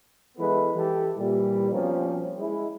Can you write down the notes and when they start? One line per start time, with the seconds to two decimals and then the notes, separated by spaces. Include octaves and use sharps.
0.37 E3 G#3 B3 E4 A4 B4
0.75 E3 G4 A4
1.16 A#2 E3 G3
1.72 B2 F3 G3 A#3 C4 C#4
2.38 G#3 E4